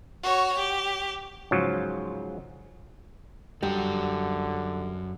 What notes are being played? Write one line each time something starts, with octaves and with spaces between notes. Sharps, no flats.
F#4 C#5
G4
G#2 C#3 F3 F#3
F#2 D3 G3 F#4 A#5